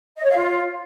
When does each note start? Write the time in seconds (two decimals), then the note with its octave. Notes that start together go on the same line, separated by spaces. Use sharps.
0.17 D#5
0.23 C#5
0.29 F5
0.35 F4